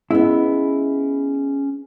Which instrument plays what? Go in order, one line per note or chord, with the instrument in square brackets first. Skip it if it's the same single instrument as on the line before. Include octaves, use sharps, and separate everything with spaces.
[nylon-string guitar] G#3 B3 [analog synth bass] C#4 [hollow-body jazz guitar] E4